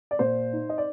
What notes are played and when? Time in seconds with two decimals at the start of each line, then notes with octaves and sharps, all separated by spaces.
0.11 D5
0.19 A#2 C5
0.53 D#4
0.69 D#5
0.78 D5